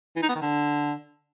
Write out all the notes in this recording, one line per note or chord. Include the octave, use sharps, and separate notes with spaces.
E3
D#4
B3
D#3
D3